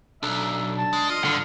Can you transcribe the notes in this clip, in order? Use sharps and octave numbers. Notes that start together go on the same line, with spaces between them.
B1 D4 A4 E5 A#5
A5
G#3
F4 D#5
G2 D3